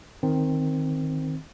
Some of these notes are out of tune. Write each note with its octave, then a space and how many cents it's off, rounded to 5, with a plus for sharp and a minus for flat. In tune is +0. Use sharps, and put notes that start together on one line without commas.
D#3 +0 C4 +0